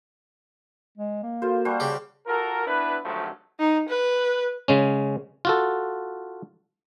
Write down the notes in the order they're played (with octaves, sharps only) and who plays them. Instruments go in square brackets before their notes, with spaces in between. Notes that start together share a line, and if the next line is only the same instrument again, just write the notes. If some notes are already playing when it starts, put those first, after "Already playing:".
[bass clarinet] G#3
A#3
[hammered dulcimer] F4 C5 [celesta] F#4 A4 A#4
[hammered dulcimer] G3 F#4 C5 [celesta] A5
[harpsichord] C#3 G4
[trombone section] F4 F#4 A4 A#4
B3 D4 E4 B4
G#1 D2 G2 F3 F#3 A3
[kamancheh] D#4
B4
[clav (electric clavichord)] C#3 G#3 C#4
F4 F#4 A4